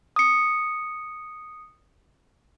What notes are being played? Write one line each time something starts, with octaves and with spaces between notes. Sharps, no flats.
D#6 C#7